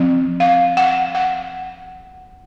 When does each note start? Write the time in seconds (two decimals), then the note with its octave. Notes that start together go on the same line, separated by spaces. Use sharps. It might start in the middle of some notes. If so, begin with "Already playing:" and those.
Already playing: F3 C4
0.40 F5
0.77 F#5
1.15 F#5